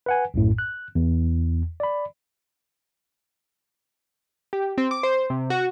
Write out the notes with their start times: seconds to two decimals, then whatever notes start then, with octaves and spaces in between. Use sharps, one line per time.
0.06 B4 F#5 G#5
0.34 A#1 F#2 A2
0.58 F#6
0.95 E2
1.80 D5 B5
4.53 G4
4.78 C4
4.91 D6
5.03 C5
5.30 C3
5.50 F#4